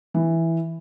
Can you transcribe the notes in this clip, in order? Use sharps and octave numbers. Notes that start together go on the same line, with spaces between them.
E3